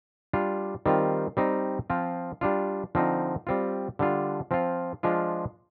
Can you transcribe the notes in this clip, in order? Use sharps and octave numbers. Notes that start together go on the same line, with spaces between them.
G3 D4 F4
D#3 G3 C4 F4
G3 C4 D#4
F3 C4 F4
G3 D4 F4
D3 F3 C4 D#4
G3 C4 F4
D3 G3 D4 F4
F3 C4 F4
F3 G#3 D4 F4